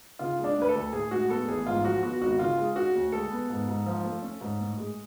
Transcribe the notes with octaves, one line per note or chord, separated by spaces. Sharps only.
C#3 F4
G#3
D4
D2 B4
A4
D2
A2 G#4
G#3 F#4
B3 A4
A1 G#4
G#2 F4
F3 F#4
B3 F#4
G#1 F#4
C#3 F4
G#3
C#4 F#4
D2
G#3 A4
B3
G#2
G#2
F3
A3
C#4
G#2
A2
G#3